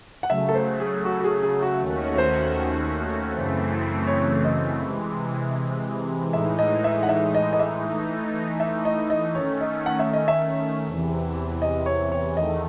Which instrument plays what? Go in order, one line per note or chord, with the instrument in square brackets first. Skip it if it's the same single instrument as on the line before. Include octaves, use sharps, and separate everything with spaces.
[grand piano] F#5
[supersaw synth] C#3 F#3 A3 [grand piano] E5
[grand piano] A4
C5
G#4
F#4
F#4
G#4
G#4
F#4
[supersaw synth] D#2 D#3 A3 C#4 F#4
[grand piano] C#5
C5
[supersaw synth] F#2 C#3 E3 A3 C4
[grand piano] C#5
D#5
[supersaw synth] C3 E3 G#3
[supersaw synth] A2 E3 G#3 D#4 [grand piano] E5
[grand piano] D#5
E5
F#5
E5
D#5
D#5
E5
[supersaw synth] E3 A3 D#4
[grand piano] E5
D#5
D#5
[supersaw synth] D#3 A3 C#4 [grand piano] C#5
[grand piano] D#5
F#5
E5
D#5
E5
[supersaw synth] E2 C3 E3
[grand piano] D#5
C#5
C#5
[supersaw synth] E2 D#3 A3 [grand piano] D#5